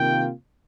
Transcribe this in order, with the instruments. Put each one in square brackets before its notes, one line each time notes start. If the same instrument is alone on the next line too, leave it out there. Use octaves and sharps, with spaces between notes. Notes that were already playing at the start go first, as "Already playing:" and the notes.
Already playing: [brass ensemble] C3 D#3 A#3 F4 G5